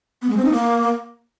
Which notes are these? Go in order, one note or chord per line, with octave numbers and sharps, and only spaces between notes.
B3
G#3
C4
D#4
A#3